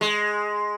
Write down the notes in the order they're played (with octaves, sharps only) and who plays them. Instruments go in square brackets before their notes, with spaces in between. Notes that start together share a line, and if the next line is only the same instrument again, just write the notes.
[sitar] G#3